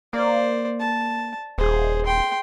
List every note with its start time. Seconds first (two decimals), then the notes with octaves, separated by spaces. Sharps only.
0.13 A#3 C5 D5
0.80 A5
1.58 D#1 G#4 C5
2.06 G5 C6